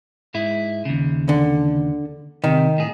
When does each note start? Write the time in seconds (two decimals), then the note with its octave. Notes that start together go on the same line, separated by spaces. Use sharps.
0.34 G#2 G#3 E4
0.85 D#2 C#3
1.29 D3
2.44 C3 D#3
2.78 A2 G#4